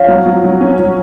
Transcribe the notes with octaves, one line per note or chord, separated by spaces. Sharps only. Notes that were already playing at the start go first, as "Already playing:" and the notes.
Already playing: F3 C#5 F5
F#3
F#3
F#3
C#4
F#3